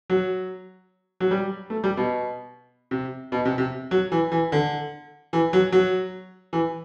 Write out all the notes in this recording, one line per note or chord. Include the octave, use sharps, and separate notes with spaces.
F#3
F#3
G3
A3
G3
B2
C3
B2
C3
C3
F#3
E3
E3
D3
E3
F#3
F#3
E3